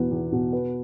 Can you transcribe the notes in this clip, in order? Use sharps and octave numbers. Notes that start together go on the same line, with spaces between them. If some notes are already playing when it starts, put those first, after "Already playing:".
Already playing: E2 B2 B3
E2
B2
B4